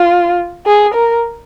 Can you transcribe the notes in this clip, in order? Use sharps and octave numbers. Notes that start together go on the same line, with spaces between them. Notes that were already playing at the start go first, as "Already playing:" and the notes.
Already playing: F4
G#4
A#4